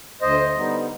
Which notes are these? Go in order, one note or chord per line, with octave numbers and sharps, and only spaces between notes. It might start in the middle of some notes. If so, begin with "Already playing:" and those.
D2 C5 D#5
D3 G3 B3 D#4